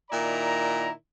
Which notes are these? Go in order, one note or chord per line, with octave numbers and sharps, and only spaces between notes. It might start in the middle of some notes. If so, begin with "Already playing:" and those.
A#2 D#3 E4 D5 A#5